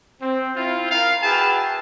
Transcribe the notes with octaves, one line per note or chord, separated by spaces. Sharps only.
C4
C4 E4 F4
A#4 F5
E4 F#4 G#4 B4 G5 A5